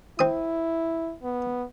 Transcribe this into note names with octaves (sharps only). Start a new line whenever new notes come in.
C4 E4 D#6
B3